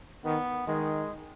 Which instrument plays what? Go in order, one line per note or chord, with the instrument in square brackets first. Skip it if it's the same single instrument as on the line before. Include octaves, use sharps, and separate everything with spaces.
[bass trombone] D#3 [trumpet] B3
[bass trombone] D#3 [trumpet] G#3